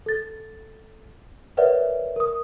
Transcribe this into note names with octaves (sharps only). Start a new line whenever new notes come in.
A4 A6
A#4 B4 C#5 D5 E5 F#5
A#4 D#6